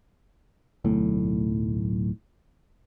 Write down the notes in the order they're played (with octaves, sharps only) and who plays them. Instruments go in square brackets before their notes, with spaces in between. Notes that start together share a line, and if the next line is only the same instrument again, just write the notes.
[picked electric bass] D1 B1 A2